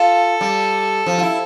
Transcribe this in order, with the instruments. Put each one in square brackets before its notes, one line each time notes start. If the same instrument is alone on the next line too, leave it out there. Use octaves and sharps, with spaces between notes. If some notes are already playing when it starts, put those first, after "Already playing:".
Already playing: [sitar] F4 [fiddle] A4
[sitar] G3
F3
F4
E4